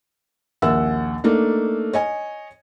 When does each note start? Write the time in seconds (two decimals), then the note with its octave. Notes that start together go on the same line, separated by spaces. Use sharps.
0.62 A#1 D#2 E5 F#5 E6
1.24 A3 A#3 D4 D#4
1.93 C#5 D#5 G#5